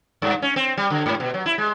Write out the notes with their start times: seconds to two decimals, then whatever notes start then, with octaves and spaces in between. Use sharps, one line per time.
0.22 G2
0.42 C#4
0.56 C4
0.77 G3
0.90 D3
1.06 G#2
1.20 B2
1.34 F#3
1.46 E4
1.58 G#3